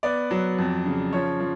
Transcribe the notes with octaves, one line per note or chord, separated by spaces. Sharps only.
B3 D5
F#3
F2
C#3
F3 C#5
F3